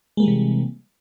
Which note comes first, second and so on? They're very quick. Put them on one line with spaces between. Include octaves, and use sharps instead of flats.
G#3 A#3 G3 E3 C3